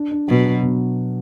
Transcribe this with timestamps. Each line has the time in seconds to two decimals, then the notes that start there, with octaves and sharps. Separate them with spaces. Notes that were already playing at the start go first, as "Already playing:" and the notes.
Already playing: D4
0.12 D4
0.28 B2 F#3
0.45 F#3
0.63 B2